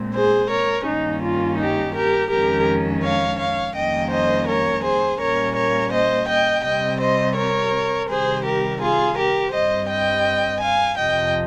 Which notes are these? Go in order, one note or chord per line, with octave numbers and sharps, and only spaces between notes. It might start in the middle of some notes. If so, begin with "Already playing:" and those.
Already playing: A#2 G#3 C4
G#4 C5
A#4 C#5
G2 D#3 G3 A#3 C#4 D#4
F4
D#4 G4
G4 A#4
F2 D#3 G#3 C#4 G4 A#4
C#5 F5
C#5 F5
F2 D#3 G3 A#3 C#4 D#5 G5
C5 D#5
A#4 C#5
G#4 C5
A#2 G3 A#3 C#4 A#4 C#5
A#4 C#5
C5 D#5
D#5 G5
C3 G3 C4 D#5 G5
C5 D#5
A#4 C#5
C3 D#3 G3 G#4 C5
G4 A#4
F4 G#4
G4 A#4
G2 G3 C4 C5 D#5
D#5 G5
F5 G#5
F2 C3 F3 D#5 G5